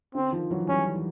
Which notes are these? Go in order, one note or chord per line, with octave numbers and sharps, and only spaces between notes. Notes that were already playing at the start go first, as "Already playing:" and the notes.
D3 C4
D#3 F3
E3 F#3
F3 G3 C#4
E3